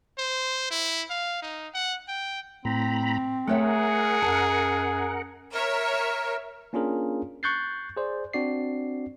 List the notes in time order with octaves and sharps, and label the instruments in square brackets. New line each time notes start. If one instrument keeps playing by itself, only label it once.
[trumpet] C5
E4
F5
D#4
F#5
G5
[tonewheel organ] A2 A#5 B5 [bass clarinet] C4
[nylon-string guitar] A3 C#5 E5 [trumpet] G#4 [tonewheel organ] A#4 F#5
[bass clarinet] F#2 [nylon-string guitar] A5
[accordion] A#4 [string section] C#5 E5
[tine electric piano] A#3 C#4 D4 F4 G#4 A#4
C#6 F#6 G6 A6 C7
G#4 C5 D5
C4 D4 F#4 D5 C7